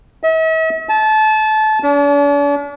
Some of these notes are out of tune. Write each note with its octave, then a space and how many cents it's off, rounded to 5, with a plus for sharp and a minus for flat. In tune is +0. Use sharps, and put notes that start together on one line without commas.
E5 -45
A5 -25
D4 -45